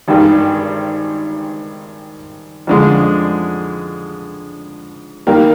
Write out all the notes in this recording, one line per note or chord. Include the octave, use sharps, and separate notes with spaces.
G#1 G2 D#3 G3
F2 D3 G#3
D#3 G3 A#3